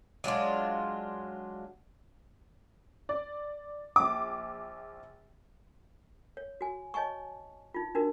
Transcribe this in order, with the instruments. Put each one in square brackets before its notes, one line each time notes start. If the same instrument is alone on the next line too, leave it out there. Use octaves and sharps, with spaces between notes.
[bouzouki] F#3 G#3 D4 F4
[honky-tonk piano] D5
A#1 D6
[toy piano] C#5
F#4 G#5
C#5 D#5 G#5 A5 C#6
D#4 F4
D4 D#4 F#4 A#4